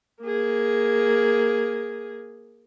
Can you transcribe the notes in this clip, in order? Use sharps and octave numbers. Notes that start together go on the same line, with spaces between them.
A#3 G#4